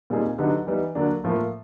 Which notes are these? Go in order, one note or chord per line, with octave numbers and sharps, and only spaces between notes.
A#2 G3 C4 D#4 G#4
D3 F#3 B3 D#4 G4
E3 G3 B3 D#4
D3 F#3 A#3 D4
A2 F3 A#3